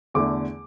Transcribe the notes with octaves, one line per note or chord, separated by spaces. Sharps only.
E2 D3 A3 D6